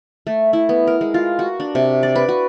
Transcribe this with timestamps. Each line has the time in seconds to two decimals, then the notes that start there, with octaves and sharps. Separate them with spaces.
0.27 A3
0.53 E4
0.69 B3
0.87 A#4
1.01 G#3
1.14 F4
1.39 F#4
1.60 D4
1.75 C3
2.03 D5
2.15 B4
2.29 F#4